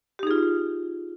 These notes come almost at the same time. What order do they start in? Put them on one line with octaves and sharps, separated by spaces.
G4 D#4 G#4 F4